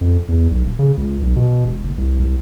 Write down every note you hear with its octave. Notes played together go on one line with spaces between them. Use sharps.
F2
E2
B1
D#1
C#3
C#2
B1
B2
E1
F#1
C2
C2